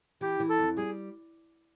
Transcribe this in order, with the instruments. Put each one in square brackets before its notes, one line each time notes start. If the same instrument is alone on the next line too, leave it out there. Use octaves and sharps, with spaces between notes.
[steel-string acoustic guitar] E3 [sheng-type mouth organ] G4
[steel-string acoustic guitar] E3
[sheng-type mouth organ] A4
[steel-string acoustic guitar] F2
[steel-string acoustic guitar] G3 [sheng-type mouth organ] G#4